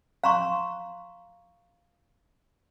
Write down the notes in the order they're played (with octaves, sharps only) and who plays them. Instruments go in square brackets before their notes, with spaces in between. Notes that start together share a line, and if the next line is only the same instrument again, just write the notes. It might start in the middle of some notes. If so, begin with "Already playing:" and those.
[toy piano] F5 A#5 C6 C#6